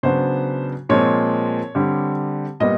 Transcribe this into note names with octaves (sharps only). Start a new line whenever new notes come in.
C#3 F#3 B3 D4 C5
A#2 F3 G#3 C4 C#5
D3 G3 C4
A#2 G3 B3 D#5